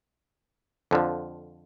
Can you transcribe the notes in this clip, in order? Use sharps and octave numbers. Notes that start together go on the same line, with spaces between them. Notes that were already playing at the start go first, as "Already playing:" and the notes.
F2 D3 F3